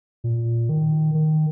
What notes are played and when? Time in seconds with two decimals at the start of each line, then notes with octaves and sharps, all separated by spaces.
0.24 A#2
0.69 D#3
1.14 D#3